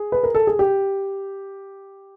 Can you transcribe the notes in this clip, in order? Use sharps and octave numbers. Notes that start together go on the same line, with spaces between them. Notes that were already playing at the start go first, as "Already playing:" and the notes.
Already playing: G#4
B4
A#4
A4
G#4
G4